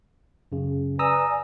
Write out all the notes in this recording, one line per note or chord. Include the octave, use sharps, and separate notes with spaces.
F#2 C#3
B4 D5 G#5 A#5 D#6 E6